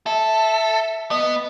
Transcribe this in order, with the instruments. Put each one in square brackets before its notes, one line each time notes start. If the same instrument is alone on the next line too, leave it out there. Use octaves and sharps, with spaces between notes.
[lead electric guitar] A4 [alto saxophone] E5
[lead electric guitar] B3 [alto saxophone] D#5